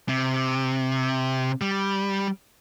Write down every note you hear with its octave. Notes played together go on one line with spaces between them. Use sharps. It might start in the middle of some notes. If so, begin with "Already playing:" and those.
C3
G3